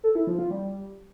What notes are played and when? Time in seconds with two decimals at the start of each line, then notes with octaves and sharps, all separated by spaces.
0.04 A4
0.15 E4
0.27 F3
0.39 F4
0.51 G3